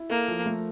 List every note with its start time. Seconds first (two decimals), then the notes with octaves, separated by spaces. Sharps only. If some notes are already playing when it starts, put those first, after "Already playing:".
Already playing: E4
0.10 A#3 A4
0.28 F3
0.46 A3